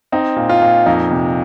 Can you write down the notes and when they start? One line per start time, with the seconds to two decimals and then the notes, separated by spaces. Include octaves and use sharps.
0.12 C4 D#4
0.36 A#2
0.49 F4
0.62 A#2
0.86 F2 D#4
1.11 C3